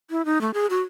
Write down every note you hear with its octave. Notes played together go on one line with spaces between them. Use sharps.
E4
D#4
A3
G#4
F#4